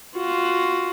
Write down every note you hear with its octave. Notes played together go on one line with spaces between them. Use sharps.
F4 F#4